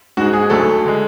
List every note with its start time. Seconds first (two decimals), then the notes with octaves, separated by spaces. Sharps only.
0.17 G#2 G#3 F#4
0.33 G#4
0.50 D2 D3 F#3 A3 A4
0.85 D3 G#3